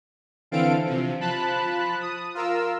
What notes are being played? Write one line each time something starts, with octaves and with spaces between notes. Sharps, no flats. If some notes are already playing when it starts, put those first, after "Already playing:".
D3 E3 C4 A4 F5 D7
C3 F3
F3 A5 B5 F#6
D#6
F4 A#4 E6